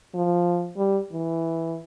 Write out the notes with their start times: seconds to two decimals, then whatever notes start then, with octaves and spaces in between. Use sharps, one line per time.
0.15 F3
0.77 G3
1.13 E3